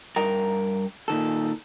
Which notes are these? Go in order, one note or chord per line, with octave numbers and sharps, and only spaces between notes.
G2 A#4 G5 A#5
A#2 D#3 A4